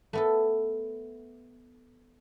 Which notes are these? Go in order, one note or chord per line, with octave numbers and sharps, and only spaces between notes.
A3 B3 A4